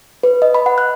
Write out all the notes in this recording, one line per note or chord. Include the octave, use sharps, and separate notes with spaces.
B4
D#5
B5
F#5
F#6